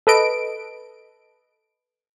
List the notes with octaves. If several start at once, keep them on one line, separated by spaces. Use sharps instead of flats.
A4 B4 D#5 D7